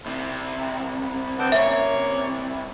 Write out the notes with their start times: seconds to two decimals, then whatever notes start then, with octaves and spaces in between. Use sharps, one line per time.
0.06 C2 C3
1.37 D3 B3 C4
1.52 A#3 C#4 C#5 E5